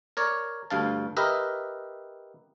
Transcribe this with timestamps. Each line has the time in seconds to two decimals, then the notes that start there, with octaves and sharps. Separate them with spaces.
0.17 A#4 C#5 D5
0.70 D2 G2 F5 A5
1.17 G4 A#4 B4 D#5 E5